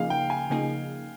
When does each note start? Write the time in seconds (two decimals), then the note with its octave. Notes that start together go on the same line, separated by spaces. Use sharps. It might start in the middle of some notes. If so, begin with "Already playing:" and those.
Already playing: C#3 F3 A#3 D#4 G#4 F5
0.10 G5
0.30 G#5
0.50 C#3 F3 A#3 D#4 G#4